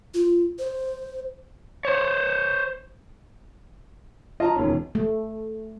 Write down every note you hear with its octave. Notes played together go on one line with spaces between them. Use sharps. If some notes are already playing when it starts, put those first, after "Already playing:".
F4
C5
C5 C#5
F4 D#5 A5 A#5
E1 D#3 C#4
A3